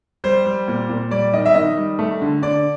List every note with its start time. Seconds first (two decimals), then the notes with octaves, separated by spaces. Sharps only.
0.24 G3 C5
0.46 G3
0.68 A#2
0.89 A#2
1.11 G3 D5
1.34 D#3 D#5
1.46 E5
1.54 D#3 D#5
1.77 G3
1.99 A3
2.21 D3
2.42 D3 D5